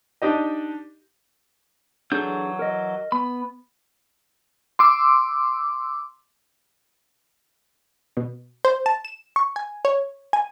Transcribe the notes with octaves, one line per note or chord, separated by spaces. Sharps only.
D4 D#4 G4 D#5
E3 F#3 D4 G#4 A4 G6
A#4 D#5
B3 B5
C6 D6 E6
B2
C5
A5
E7
C#6
G#5
C#5
G#5